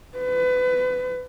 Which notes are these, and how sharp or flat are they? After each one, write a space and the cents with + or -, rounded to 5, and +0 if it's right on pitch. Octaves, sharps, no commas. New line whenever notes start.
B4 +30